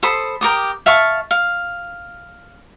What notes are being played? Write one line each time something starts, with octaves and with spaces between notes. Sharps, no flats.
A4 C5 B5 D#6
G4 A#4 D6 D#6
E5 F5 A5 C#6
F5